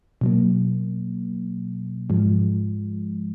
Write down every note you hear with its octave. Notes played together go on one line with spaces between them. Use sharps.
B2 F#3 A#3
G#2 F3 G#3